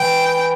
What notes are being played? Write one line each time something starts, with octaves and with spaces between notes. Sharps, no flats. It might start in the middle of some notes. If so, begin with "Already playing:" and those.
Already playing: E3 G5